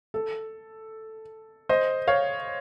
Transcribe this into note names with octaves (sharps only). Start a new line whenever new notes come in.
A4
C5 D#5
C#5 F5